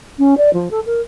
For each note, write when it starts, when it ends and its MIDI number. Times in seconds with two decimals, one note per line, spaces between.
0.18 0.37 61
0.37 0.50 74
0.53 0.69 53
0.71 0.80 69
0.86 1.01 70